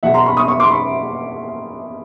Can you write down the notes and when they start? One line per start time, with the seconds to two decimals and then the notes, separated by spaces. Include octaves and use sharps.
0.03 E2 B2 F#3 E5 F#5
0.14 A#5 C6
0.26 B5 C#6
0.37 C#6 D#6
0.48 C#6 D#6
0.60 C6 D6
0.71 B5 C#6